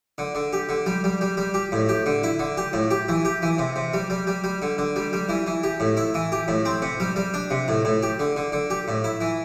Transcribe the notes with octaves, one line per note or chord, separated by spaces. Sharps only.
D3
D3
G4
D3
G3
G3
G3
G3
G4
A2
G4
D3
E4
D3
G4
A2
G4
E3
G4
E3
C3
C3
G3
G3
G3
G3
D3
D3
G3
G3
E3
E3
G4
A2
E4
E3
G4
A2
C4
C3
G3
G3
D4
C3
A2
A2
G4
D3
D3
D3
G4
A2
E4
E3